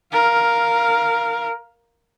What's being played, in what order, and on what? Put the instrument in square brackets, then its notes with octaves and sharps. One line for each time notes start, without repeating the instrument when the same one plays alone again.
[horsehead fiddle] A#4 F5